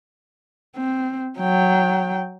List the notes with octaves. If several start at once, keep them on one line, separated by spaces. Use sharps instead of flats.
C4
F#3 G5